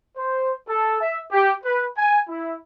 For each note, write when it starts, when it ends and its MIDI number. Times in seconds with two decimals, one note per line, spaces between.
0.16 0.52 72
0.68 0.99 69
1.02 1.21 76
1.32 1.52 67
1.64 1.87 71
1.97 2.20 80
2.29 2.53 64